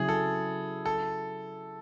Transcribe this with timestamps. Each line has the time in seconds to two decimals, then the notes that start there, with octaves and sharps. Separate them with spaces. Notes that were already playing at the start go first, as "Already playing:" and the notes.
Already playing: C#3 F#3 E4 G#4
0.09 A4
0.86 A4